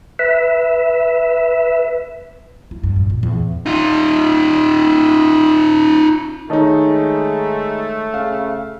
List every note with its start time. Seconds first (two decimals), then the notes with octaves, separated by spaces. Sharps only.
0.19 B4 E5
2.71 E4
2.83 G2
2.96 A#2
3.10 A#2
3.23 E2
3.66 D#4 F4
6.50 D#3 G#3 A3 D#4 C#5 D#5 A5
8.14 C#3 F5